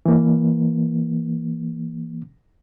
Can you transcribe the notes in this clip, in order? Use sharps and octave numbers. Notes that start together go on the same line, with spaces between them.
E3 A#3